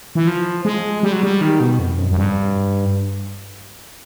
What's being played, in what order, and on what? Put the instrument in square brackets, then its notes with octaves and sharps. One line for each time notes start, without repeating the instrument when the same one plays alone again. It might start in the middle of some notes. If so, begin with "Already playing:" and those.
[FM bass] E3
F3
G#3
G3
F#3
G3
D#3
B2
F2
F#2
F#2
G2